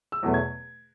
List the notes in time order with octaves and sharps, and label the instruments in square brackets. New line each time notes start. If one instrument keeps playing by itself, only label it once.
[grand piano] E6
E2 B2 F#3 A3
G#6